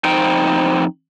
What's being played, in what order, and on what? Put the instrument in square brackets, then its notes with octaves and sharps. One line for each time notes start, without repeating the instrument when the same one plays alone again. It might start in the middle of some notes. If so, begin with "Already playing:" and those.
[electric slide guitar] F2 D#4 C5 G5